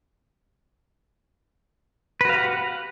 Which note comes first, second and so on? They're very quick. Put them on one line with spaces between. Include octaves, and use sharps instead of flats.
B4 F#4 F5 G4 F#5